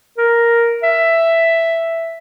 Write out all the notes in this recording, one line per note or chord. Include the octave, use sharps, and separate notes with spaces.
A#4
E5